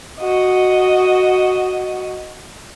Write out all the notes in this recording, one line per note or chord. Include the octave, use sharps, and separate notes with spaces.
F#4 D#5